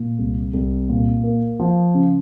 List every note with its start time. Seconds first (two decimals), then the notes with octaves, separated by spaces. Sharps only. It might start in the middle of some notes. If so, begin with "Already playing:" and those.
Already playing: A#2
0.19 C2
0.53 C2
0.89 A#2
1.23 A#3
1.60 F3
1.94 C#3